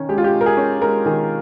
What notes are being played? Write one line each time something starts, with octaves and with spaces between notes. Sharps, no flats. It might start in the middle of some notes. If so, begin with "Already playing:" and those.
Already playing: D#3 C#4
G#3 G4
F4
G4
G#3
A#4
G#4
C#4
G#3 A#4
D#3 G#4